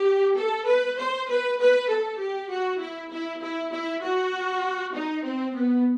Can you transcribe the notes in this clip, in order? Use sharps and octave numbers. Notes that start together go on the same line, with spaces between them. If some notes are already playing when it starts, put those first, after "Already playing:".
Already playing: G4
A4
B4
C5
B4
B4
A4
G4
F#4
E4
E4
E4
E4
F#4
D#4
C4
B3